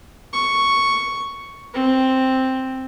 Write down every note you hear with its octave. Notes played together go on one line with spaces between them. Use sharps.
C#6
C4